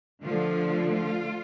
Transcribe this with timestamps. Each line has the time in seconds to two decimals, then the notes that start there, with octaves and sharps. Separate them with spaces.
0.24 D3 F3 A3 F4
0.93 F4